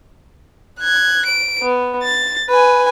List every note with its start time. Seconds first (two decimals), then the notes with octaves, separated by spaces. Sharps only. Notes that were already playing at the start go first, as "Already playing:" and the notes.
0.80 F#6 G#6
1.26 D7
1.62 B3
2.03 A6
2.49 B4 G#5